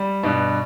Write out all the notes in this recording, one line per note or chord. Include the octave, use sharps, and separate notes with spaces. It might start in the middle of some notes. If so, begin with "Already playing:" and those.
Already playing: G3
G2 B2